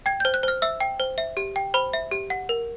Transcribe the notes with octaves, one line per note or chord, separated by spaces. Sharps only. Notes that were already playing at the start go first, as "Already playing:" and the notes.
G5 G#6
C5 G6
F#6
C5 F6
E5 E6
G5
C5
E5
G4
G5
C5 B5
E5
G4
F#5
A#4